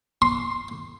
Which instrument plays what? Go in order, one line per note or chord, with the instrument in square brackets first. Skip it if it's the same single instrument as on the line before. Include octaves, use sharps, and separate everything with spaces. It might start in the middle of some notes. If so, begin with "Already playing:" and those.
[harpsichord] C6